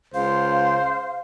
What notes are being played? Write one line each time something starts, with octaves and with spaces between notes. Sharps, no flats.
C#2 C5 F5